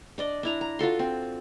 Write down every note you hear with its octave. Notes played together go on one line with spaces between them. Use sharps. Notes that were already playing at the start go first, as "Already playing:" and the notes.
D4 D5 D#5
D4 E4 A#5
A#5
F4 F#4 A4 C6
C4